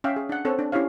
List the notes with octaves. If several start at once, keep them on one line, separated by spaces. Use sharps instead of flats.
C#4 E5 F5 G5
G#4
D4 F#5
C4 A4 C#5
D4
C#4 E4 G4 C#5 F5